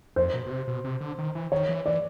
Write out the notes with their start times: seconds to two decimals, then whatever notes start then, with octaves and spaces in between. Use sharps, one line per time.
0.16 F2 C5
0.34 B2
0.46 B2
0.51 C3
0.68 B2
0.84 C3
1.01 D3
1.18 D#3
1.35 E3
1.52 D#3 C#5
1.69 E3
1.86 E3 D5